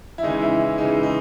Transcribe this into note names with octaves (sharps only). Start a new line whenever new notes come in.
E4
C#3 E3 G#3 D#4
E4
E4
C#3 E3 G#3 D#4
D#4